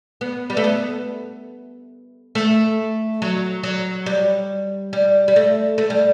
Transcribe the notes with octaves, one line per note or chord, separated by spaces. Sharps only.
B3
G3
A3
B3
A3
F#3
F#3
G3
G3
G3
A3
A3
G3